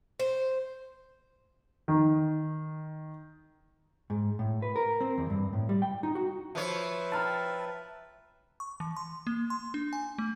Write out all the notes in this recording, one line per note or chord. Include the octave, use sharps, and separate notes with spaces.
C5
D#3
G#2
A2
B4
A#4
C4
E2
G2
A2
G3
G5
D#4
F#4
F3 B4 C#5 E5
G5 A5 A#5 F6 A6
C#6
E3
C6
A#3
C6
D4
G#5
A3